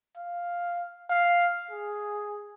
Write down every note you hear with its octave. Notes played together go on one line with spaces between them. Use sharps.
F5
F5
G#4